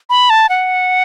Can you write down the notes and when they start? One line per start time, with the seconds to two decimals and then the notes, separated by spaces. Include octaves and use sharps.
0.10 B5
0.30 A5
0.49 F#5